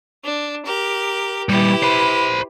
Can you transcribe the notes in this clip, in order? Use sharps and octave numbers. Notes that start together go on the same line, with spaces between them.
D4
G4 A#4
A#2 G3 E4 G4 B4
C5 B5